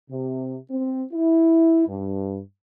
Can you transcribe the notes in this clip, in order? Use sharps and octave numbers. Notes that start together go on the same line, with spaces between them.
C3
C4
E4
G2